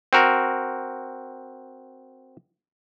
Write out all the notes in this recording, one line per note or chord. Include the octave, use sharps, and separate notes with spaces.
C4 F#4 A#4